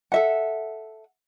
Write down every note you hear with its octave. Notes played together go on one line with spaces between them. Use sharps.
A4 E5 F#5